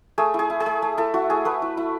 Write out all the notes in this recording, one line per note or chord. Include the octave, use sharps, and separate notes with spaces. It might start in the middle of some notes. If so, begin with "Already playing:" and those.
A3 G#4
E4
G#4
E4
G#4
A3
A3
E4 A4
E4 F#4
A3 G#4
A3 B4
E4
E4